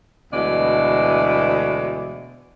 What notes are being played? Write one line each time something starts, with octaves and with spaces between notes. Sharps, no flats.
D2 B2 E3 G#3 D5